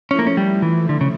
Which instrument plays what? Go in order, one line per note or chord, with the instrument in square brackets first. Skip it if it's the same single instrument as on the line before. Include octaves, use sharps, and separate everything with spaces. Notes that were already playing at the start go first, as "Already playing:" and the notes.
[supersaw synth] F3 A3 E4 [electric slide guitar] C#4
[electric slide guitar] A#3
C#4
G3
E3
D3
C#3